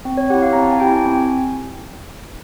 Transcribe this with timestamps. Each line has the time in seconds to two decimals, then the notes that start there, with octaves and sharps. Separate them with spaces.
0.05 C4
0.17 C#5
0.30 E4 G4 F#5
0.42 F5
0.53 C4 A#5
0.62 A5
0.72 G#5
0.80 E4 G4 G5
1.05 C4 G#5